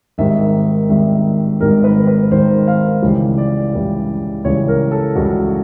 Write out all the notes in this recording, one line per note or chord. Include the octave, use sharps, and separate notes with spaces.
G#1 G#2 D#3 G3 E5
G#1 G#2 D#3 G3 E5
G#1 G#2 D#3 G3 A#4
B4
B4
G#1 G#2 D#3 G3 C5
F5
C#2 C#3 E3 G3
D5
C#2 C#3 E3 G3
C#2 C#3 E3 G3 C#5
A#4
A4
C#2 C#3 E3 G3 F#4